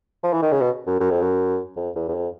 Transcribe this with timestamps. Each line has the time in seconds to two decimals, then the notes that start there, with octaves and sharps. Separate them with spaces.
0.24 F3
0.33 E3
0.42 D#3
0.52 C#3
0.61 B2
0.87 F#2
1.00 F#2
1.11 F2
1.22 F#2
1.76 F2
1.96 E2
2.08 E2
2.15 F2